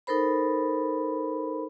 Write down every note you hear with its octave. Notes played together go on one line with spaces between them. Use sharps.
D#4 A4 A#4 C5 B5